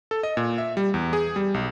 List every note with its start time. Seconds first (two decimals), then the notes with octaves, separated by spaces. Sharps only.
0.11 A4
0.23 D#5
0.37 A#2
0.58 E5
0.77 G3
0.94 E2
1.13 G#4
1.36 G3
1.54 B1